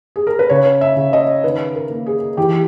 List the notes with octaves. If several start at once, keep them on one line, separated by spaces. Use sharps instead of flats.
G#4
A#4
B4
C#3 C#5
E5
C#3
D#5
D#3 B4
A#4
A#3
G#4
E3 G4